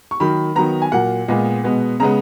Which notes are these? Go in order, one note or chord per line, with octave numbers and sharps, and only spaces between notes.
C#6
D#3 F#3 A#3 B5
D#3 F#3 B3 A#5
G#5
A#2 F#3 A#3 F#5
A#2 G#3 B3
B2 G#3 B3
C#3 G#3 B3 A#5